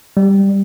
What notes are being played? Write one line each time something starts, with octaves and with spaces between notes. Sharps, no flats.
G3